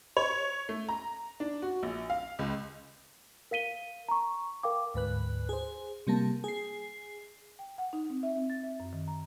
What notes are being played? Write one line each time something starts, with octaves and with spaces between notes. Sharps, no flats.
C#5
A3
A#5
D4
F#4
A#1
F5
C#2
A#4 F5 B6 D#7 G7
A#5 C#6
A#4 F5 G5 D6
D2 G#2 B4 F#6
G#4 C5
C3 G3 A#3 A5
G#4 C7
G5
F#5
D#4
C4
E5
C4
A6
E5
F#2
D#3
A#5